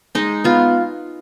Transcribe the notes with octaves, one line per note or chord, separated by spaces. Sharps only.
G#3 D#4
B3 F4